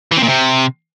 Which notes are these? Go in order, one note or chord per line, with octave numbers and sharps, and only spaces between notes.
E3
C3
A#2
C3